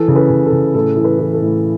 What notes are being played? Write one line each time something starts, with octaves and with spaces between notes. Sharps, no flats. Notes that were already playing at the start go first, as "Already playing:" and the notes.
Already playing: E3 A4
C#3
B4
C#3
A4
C#3
A2 A4
E3
B4
E3
A4
A2